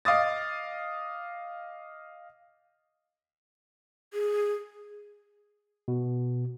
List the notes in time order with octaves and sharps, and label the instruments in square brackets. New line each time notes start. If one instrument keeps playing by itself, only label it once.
[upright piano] D#5 F5 D6 D#6 A6
[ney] G#4
[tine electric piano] B2